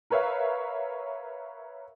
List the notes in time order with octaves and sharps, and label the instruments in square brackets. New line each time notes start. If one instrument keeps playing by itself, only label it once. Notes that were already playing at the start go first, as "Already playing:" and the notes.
[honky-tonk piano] A#4 B4 C#5 E5 F5